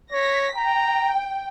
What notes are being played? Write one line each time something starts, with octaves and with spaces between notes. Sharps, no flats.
C#5 A#6 B6
G5 A#5